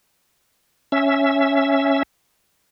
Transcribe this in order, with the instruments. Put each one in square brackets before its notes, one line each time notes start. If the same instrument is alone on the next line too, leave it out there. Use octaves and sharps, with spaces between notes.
[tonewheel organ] C#4 E5